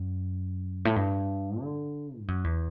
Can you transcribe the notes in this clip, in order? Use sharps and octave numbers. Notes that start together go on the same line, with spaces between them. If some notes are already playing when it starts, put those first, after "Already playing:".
Already playing: F#2
A2
G2
D3
G2
F#2
E2